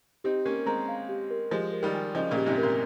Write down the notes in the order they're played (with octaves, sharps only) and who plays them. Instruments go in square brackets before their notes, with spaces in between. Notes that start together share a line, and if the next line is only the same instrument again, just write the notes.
[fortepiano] C4 D#4 [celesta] G4
[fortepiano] A#3 C#4 [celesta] A#4
[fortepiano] G#3 C4 [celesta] A#5
[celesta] F5
G4
A#4
[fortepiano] F3 G#3 [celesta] G4
[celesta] A#4
[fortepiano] D#3 G3
[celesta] G#5
[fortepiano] C#3 F3 [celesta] D#5
[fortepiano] A#2 C#3
[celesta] G4
[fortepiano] G#2 C3
[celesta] A#4
[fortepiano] A#2